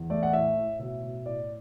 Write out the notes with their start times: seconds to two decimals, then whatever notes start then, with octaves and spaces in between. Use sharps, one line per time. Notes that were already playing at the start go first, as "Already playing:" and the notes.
Already playing: E2
0.10 A3 D5
0.23 F#5
0.33 A2 E5
0.57 A2
0.79 B2 E5
1.02 B2
1.25 A2 D5